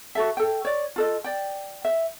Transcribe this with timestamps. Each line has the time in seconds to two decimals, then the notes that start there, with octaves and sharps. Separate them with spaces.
0.15 F#4 A4 E5
0.37 A4 G5
0.65 C#5 D5
0.96 F4 A4 D#5
1.24 D5 G5
1.85 E5